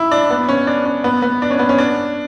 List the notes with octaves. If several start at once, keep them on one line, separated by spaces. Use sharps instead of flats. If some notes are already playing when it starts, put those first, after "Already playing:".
Already playing: E4
D4
B3
C#4
D4
C#4
B3
B3
D4
C#4
B3
C#4
D4